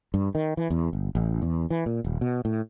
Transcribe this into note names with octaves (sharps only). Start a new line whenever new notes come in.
G2
D#3
E3
E2
G1
A1
E2
E3
A#2
D#1
B2
A2